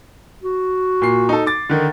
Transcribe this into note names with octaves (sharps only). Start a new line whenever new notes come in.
F#4
A#2 C7
D#4 A4
D6 A6
D3 D#3